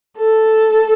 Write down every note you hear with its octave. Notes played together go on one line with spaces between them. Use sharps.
A4